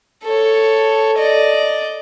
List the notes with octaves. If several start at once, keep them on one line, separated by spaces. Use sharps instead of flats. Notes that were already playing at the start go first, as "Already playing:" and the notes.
A4 C#5
D5 D#5